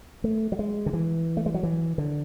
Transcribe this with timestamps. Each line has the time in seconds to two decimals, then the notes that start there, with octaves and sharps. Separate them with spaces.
0.24 A3
0.52 F#3
0.59 G#3
0.86 D3
0.93 E3
1.37 A3
1.46 G#3
1.54 F#3
1.63 E3
1.98 D3